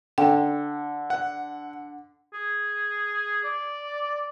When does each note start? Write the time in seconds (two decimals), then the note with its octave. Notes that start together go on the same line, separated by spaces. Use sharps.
0.18 D3 G5
1.10 F#5
2.34 G#4
3.44 D5